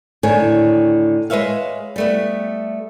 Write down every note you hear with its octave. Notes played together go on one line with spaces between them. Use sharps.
A2 D3 D#3 C#5 G#5
G#3 B4 C#5 E5 F5
G3 A3 B3